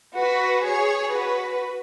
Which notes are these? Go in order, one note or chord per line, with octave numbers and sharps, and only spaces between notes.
F#4 B4
G#4 C#5
F#4 B4